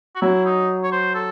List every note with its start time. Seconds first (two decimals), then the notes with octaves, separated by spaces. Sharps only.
0.15 F#4
0.21 F#3 E4
0.46 D#4
0.83 C#5
0.92 C5
1.15 A4